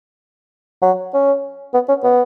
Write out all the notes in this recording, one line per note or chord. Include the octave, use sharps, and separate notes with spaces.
F#3
C#4
B3
C#4
B3